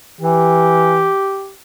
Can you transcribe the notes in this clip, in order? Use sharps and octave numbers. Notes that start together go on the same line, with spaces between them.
E3 G4